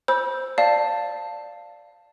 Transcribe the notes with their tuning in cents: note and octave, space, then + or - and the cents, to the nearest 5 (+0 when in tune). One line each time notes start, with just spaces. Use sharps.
C5 +0 B5 -30 E6 +0
D5 +0 F5 +0 A5 +5